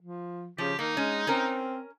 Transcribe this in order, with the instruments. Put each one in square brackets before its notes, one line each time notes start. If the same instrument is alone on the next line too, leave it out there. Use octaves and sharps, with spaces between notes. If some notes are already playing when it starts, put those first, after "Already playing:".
[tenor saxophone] F3
[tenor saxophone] C#3 [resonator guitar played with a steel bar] F3 [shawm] G4
[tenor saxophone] D#3 [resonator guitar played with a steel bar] A#3 [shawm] D#4
[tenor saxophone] G#3 [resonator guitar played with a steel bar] C#4
[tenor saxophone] C4 [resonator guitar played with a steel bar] C#4 A#4